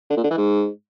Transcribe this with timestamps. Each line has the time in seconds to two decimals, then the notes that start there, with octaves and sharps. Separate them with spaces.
0.10 D3
0.17 A#2
0.24 D3
0.30 E3
0.37 G#2